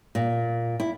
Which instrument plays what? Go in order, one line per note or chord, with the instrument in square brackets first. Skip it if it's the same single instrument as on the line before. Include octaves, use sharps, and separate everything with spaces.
[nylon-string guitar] A#2
E4